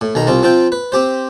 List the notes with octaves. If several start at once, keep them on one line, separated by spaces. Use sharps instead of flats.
A2
B1 D#3 A#5
C2 C4 F4
F3 C4 F4 G5
B4
C4 G4 C5